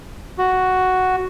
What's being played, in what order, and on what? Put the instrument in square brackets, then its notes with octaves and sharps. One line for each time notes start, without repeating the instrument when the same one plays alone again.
[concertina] F#4